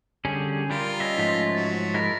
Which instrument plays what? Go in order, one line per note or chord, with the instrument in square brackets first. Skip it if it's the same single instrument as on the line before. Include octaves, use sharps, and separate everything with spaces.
[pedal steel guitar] D3 G3 G#4 [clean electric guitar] C#4
[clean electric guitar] G3 [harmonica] F4 [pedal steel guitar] A#4
[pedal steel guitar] C#4 D#5 E5
[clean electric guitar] G#2 F3 A3 [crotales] B6
[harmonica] F#3 [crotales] A6
[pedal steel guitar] G#3 E4 A#4 [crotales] A#6